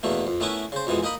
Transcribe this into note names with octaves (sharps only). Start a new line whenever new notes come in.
E2 B2 A3 A#3
F2
A3 B3 C#4 E4 A#4 B4
C#3 C5
F2 B2 E3 G#3
A#3 D#4 A#4 D#5 B5